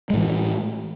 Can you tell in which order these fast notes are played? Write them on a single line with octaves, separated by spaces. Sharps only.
G#3 A2 E3